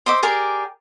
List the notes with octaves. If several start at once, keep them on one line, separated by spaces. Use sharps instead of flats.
C5 D#5 E5 D6
G4 G#4 A#4 D5